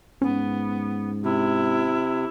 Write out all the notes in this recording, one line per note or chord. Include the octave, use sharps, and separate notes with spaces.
G#2 B3 C#4
C3 E4